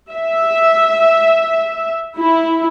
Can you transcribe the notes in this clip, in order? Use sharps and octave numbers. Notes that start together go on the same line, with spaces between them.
E5
E4